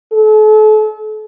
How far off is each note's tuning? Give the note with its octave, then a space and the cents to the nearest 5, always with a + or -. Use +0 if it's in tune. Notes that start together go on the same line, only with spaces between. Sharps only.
A4 -40